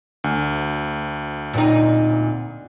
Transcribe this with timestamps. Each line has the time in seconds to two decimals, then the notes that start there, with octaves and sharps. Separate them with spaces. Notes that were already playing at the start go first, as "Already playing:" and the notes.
0.24 D2
1.53 A#2 C4 D#4